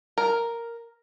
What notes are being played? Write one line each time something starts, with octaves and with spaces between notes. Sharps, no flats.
A#4